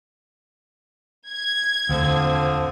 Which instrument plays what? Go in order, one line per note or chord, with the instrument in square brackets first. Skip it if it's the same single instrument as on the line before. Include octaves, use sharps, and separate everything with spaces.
[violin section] G#6
[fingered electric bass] E1 D2 [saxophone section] D3 F3 C4